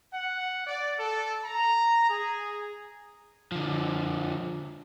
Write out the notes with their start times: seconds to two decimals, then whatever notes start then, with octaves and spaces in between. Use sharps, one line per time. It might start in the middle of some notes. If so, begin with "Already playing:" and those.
0.14 F#5
0.67 D5
1.00 A4
1.45 A#5
2.10 G#4
3.52 D3 F3